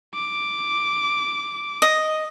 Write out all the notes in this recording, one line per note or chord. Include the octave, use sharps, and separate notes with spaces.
D6
D#5